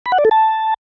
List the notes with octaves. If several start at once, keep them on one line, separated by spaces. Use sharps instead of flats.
B5
F#5
D5
A4
A5